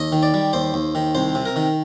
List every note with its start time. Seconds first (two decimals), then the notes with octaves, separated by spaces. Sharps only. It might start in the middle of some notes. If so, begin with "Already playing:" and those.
Already playing: D#2 D#5
0.12 D#3
0.23 D5
0.34 G3
0.53 D#2 C5
0.74 D#2
0.95 D#3
1.15 C2 C5
1.35 C3
1.45 A#4
1.56 D#3